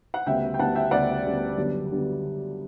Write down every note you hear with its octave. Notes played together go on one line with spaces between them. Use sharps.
F#5
D2 C#3 G3 B3 E5 G5
G5
D2 C#3 G3 B3 F#5 A5
E5 G5
D2 C#3 G3 B3 D5 F#5
D2 C#3 G3 B3
F#2 D3 G3 B3
D3 G3 B3